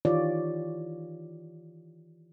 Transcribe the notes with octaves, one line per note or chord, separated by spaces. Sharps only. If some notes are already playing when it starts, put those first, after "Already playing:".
D#3 E3 F4 G4 C#5 D5